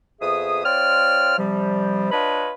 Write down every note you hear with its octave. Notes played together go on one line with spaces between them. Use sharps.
F2 B3 G#4 E5 D#6
C4 F4 C#5 D5 F6
C3 F3 G3
D4 F4 B4 C#5 D#5 B5